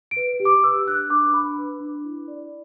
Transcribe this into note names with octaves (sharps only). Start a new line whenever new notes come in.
D7
B4
G4
D6
B4 E6
D4 F#6
D4 D6
D4 B5
B4
D4
E4
D5